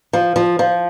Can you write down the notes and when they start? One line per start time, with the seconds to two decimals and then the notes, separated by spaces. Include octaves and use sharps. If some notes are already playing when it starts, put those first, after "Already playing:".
0.13 F3
0.36 F3
0.59 F3